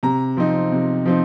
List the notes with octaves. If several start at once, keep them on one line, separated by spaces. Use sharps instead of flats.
C3 A#5
F3 C4 D#4
C3
F3 C4 D#4